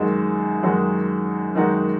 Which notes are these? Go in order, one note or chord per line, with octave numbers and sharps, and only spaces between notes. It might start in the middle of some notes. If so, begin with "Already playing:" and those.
Already playing: F#2 D#3 G#3 D#4 F#4
F#2 D#3 G#3 D#4 F#4
F#2 D#3 G#3 D#4 F#4